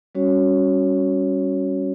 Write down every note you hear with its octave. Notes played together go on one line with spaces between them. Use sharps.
G3 C#4 F#4 C#5